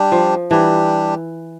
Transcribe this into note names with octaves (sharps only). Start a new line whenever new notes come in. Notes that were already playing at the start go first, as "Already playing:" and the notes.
Already playing: G3 D4 G4
F3
E3 G3 D4 G4